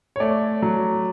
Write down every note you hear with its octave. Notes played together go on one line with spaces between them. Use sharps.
C#5
A3 D5
F#3